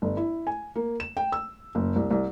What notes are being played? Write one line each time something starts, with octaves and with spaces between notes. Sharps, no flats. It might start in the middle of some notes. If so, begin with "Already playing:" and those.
G1
E4
G#5
A#3
E7
G5
E6
F#1
C2
C2